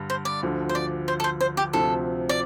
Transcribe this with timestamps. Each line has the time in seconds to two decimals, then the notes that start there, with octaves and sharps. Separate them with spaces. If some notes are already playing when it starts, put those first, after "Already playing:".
Already playing: G2 D3 G3
0.10 C5
0.25 D5
0.43 D2 D3 F3
0.69 C5
0.75 D5
1.08 C5
1.20 A4
1.24 C5
1.40 C5
1.57 G4
1.73 D2 C3 F3 C4 A4
2.29 D5